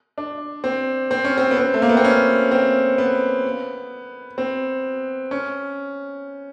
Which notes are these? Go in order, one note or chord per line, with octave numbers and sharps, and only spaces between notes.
D4
C4
C4
C#4
C4
B3
C4
A3
A#3
B3
C4
C#4
C4
B3
C4
C#4